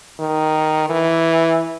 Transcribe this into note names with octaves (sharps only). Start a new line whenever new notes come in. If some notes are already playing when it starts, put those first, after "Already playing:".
D#3
E3